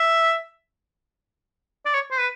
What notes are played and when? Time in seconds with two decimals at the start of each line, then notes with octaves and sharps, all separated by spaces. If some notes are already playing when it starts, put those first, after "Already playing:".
Already playing: E5
1.86 D5
1.94 C#5
2.11 C5
2.19 B4